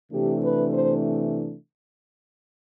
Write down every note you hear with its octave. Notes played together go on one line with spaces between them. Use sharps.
C3 E3 A3 D4 G4
B4
C5